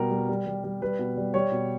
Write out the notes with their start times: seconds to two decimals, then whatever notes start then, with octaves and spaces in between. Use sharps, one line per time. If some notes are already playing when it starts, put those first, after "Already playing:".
Already playing: B2 G3 A#4
0.11 G3
0.29 G3
0.47 G3
0.64 G3
0.82 G3 B4
0.99 B2
1.17 G3
1.34 G3 C#5
1.52 B2